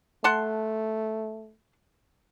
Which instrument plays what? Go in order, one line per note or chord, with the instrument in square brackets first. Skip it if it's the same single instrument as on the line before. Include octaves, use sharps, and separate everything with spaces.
[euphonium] A3 [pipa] F#5 A5 C6